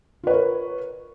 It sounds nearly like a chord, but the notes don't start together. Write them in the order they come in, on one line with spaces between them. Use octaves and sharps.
F4 B4 C#5 A#4